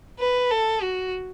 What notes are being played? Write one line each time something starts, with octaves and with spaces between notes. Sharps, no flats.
B4
A4
F#4